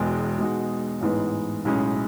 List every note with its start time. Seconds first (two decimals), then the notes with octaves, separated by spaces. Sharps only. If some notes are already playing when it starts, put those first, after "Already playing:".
Already playing: E1 E2 B2 G#3
0.38 B2 G#3 D#4 F#4
1.01 A1 G#2 E3 G#3 B3
1.65 B1 A2 G#3 C#4